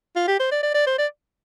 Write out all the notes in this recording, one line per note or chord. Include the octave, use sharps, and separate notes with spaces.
F4
G4
C5
D5
D5
D5
C5
D5